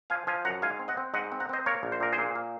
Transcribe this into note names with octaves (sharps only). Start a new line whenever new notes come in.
F3 F5 G#5
F3 F5 G#5
F#2 F#5 A#5
G#2 F5 G#5
C4
D#5 F#5
C4
G#2 D#5 F#5
C4
F#5 A#5
C4 C5 D#5
A#3 A#4 C#5
A#1
C5
A#2 A#4
G#4 C5
A#2
A#3